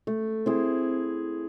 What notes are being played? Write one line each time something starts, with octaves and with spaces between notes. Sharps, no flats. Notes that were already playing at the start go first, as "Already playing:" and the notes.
A3
C4 E4 G#4